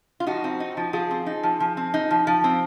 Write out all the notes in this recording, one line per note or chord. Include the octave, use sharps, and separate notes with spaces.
F4
F3 D#4 F#4
C4
D#4
F3
F3 F4 G#4
C4
D#4
F3
F3
C4
D#4
F3
F3
C4